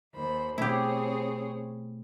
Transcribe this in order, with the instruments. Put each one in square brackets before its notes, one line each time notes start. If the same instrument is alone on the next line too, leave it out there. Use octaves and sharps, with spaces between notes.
[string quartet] D#2 C5 B5
[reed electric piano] B2 A3 [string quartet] C4 G#4 C#5 [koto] E4 G4